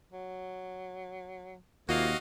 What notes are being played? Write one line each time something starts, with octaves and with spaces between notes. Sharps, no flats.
F#3
D#2 C3 A#3 F4 F#4 D#5 F5